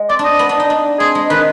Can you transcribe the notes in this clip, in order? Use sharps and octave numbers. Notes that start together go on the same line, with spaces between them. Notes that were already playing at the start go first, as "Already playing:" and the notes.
Already playing: G#3
C4 D5
D4
D#5
B3
D4
D#4
D4
C4 G#4
G#3
D#3 B4